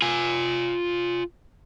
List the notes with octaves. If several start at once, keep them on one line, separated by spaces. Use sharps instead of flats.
F4 G#5